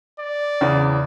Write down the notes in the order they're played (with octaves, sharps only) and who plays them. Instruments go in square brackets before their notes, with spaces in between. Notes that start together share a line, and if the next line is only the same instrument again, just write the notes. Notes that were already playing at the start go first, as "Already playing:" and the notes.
[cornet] D5
[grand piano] E2 C#3